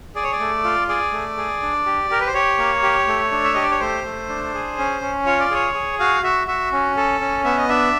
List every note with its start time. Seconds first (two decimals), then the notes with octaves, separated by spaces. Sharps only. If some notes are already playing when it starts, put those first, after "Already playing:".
0.15 G#4 D5
0.24 C#5
0.32 D5
0.40 A3
0.64 F4
0.88 G#4 D5
1.13 A3
1.37 G#4
1.62 D4
1.86 G4
2.10 G4 A#4
2.20 B4
2.27 C5
2.34 G4 C#5
2.58 A#3
2.83 G4
3.08 A3
3.32 D4
3.44 E5
3.54 G4 D#5
3.62 D5
3.71 C#5
3.80 A3 C5
4.04 A3
4.29 D4
4.54 G#4
4.78 C#4
5.01 C#4
5.26 F4 C#5
5.40 D5
5.51 G#4 C#5
5.74 G#4
5.99 F#4 F5
6.23 F#4 E5
6.47 F#4 E5
6.72 C#4
6.97 A4
7.20 C#4
7.44 B3 E5
7.57 D#5
7.69 D4 E5